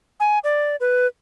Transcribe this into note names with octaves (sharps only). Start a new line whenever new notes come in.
G#5
D5
B4